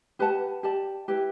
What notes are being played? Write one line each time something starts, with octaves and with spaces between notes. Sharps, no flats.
G4 B4 F#5 A5
G4 D5 A5
E4 G4 B4